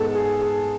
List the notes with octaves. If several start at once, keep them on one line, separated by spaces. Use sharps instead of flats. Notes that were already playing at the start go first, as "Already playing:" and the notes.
Already playing: G#2 G#3 B3 A4
G#4
G#4